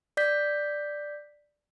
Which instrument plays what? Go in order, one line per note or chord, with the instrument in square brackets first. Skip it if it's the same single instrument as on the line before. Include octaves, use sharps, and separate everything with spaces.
[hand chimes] D5 G6 B6